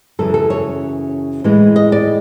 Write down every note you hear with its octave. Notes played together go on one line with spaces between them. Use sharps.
F#2 C#3 E3 A4
A4
C#5
A2 E3 G#3
D#5
D5